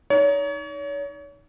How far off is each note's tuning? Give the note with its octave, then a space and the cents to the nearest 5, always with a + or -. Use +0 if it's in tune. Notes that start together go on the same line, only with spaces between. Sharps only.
D#4 +0 C#5 +35